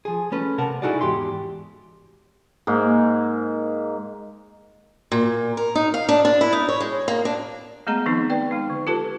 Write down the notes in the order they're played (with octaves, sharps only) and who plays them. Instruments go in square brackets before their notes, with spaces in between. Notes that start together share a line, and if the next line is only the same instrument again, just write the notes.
[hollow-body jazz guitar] F3 G#4
A3 C#4 B4
C3 A#4 F#5 A5
D#4 E4 F#4 G#4 A4 D5
E2 G#2 G4 C6
[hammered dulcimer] G#2 A#3
[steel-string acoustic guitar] A#2
A#4
D#4
F5
D4
D4
E4
D#4
C#5
G#3
A#3
D4
[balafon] G#3 A3 B3 G#4 D#5 A#5
D#3 F3 B3 C4 D#4
B4 D5 G5
G#3 D#4
D3
F4 G4 A4 B4 A5